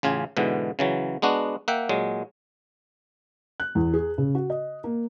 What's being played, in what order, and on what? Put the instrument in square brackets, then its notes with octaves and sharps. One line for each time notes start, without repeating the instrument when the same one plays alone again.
[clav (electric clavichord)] A1 C#3 F4 G#5
G#2 B2 D3 E3
C#3 E3 F#3
G#3 B3 D4 F#4
A#3 E5 F#5 G5
A#2 F#3 G#3
[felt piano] F#6
E2
G#4
C#3
F#4
D#5
A#3